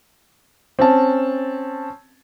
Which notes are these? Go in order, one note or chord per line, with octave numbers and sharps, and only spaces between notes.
C4 C#4 A5